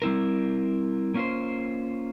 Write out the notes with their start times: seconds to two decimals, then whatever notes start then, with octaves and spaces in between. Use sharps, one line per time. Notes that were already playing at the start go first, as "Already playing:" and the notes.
0.02 G3 C4 E4 A#4
1.14 A#3 C#4 F4 C5